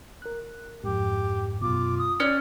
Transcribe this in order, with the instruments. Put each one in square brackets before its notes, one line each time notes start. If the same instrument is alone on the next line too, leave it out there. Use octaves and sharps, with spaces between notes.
[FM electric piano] A#4 F#6
[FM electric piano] F2 G#2 [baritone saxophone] G4
[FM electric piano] F#2 B2 [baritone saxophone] F4 [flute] D6
[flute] D#6
[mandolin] C#4 [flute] D5 [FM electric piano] F#6